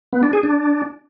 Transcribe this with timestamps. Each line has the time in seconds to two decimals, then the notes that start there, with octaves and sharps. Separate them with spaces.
0.13 B3
0.23 D4
0.33 G#4
0.43 D4